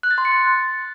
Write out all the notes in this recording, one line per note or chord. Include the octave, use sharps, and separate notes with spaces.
F#6
A6
C6
C#7
A6